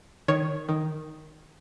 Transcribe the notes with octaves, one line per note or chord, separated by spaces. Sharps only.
D#3 C#5
D#3